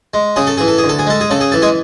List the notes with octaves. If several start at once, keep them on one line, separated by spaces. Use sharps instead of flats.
G#3
C#3 G#4
A4
E3 G#4
A4
G#4
D2
A4
G#4
G#3 A4
G#4
C#3 A4
G#4
E3 A4
G#3 G#4